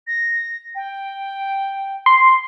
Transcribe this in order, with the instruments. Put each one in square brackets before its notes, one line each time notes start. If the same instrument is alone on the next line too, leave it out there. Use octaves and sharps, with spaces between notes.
[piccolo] A#6
G5
[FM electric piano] C6